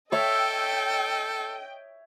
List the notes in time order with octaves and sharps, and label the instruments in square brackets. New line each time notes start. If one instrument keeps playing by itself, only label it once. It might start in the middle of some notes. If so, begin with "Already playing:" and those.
[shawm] A4 [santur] C#5 E5 [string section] D#5 G5